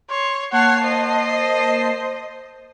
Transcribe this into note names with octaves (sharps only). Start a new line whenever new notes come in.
C#5 C6
A#3 C#5 F#5 A5 C7
C5 D#5